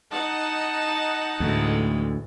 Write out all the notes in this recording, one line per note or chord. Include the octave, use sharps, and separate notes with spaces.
D#4 F#5 A5
D2 A2 E3 G#3